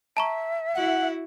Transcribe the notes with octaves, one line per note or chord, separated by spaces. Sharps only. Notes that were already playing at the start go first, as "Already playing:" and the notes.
E5 A5 A#5 C#6
E4 F#4 F#5